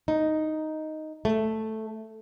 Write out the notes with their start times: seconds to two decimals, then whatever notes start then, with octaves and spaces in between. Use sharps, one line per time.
0.08 D#4
1.25 A3